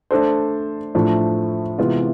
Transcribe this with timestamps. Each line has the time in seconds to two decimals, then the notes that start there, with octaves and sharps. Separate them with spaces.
0.11 A3 D4 A4 C5
0.95 A2 F3 A3 D4
1.78 C3 E3 G#3 B3 F4